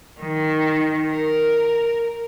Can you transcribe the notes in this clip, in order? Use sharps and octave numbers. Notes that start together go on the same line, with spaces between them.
D#3
A#4